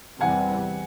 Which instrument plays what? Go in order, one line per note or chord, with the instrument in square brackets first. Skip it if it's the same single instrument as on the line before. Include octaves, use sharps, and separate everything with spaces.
[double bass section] E2 C3 E3 G3 [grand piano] F#5 G#5